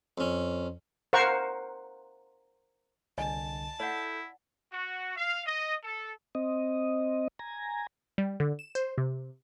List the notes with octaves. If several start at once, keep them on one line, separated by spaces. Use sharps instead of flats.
F2 C#4
A#4 C5 F5 F#5 C#6
C2 D3 D5 D#5 G#5 A5
E4 A4 D5 F#5 G6
F#4
F5
D#5
A4
C4 D#5
G#5 A#5
G3
D3
E7
C5
C3